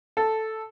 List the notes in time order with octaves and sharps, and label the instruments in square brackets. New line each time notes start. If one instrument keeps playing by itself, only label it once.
[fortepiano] A4